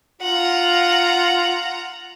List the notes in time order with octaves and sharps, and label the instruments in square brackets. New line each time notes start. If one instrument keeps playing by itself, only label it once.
[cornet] F4 [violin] F#5 A#5